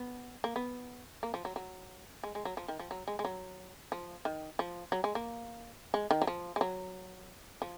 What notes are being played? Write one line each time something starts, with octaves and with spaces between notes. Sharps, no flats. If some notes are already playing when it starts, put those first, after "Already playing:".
Already playing: B3
A#3
B3
A#3
F3
F#3
F#3
G#3
G#3
F#3
F3
D#3
F3
F#3
G#3
G#3
F#3
F3
D#3
F3
F#3
G#3
A#3
G#3
D#3
F#3
F3
G#3
F#3
F3